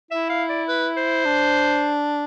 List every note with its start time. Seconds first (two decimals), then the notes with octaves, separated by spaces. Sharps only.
0.11 E4 E5
0.30 F5
0.49 D5
0.68 B4
0.97 C5
1.26 D4